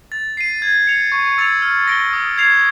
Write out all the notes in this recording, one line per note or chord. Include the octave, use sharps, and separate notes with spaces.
A6
C7 D#7
G#6
C#7 F7
C#6
E6 A6 C#7 F7
F6
A#6 D7 G7
D#6
G#6 C7 F7